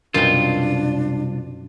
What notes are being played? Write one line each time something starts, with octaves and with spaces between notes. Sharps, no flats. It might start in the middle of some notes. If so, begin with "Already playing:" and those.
C2 F#2 B2 D4 F4 G5